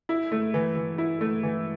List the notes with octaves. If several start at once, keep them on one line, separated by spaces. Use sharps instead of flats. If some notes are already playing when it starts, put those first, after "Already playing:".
E4
A3
E3
E3
E4
A3
E3